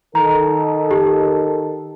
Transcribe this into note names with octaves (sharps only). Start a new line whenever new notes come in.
D#3 A4 A#5
G4